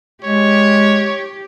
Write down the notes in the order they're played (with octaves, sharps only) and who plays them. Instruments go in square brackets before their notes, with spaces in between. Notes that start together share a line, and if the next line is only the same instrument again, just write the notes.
[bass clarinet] G#3 [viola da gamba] G4 [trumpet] C#5